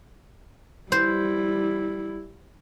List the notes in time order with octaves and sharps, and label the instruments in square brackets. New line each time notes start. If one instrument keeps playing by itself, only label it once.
[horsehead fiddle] G3 E4 [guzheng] C5